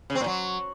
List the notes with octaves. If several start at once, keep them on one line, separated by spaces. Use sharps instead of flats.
C#3
C4
A#2
F#3